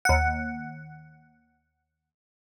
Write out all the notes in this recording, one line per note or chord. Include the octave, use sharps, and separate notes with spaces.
D#2 F#5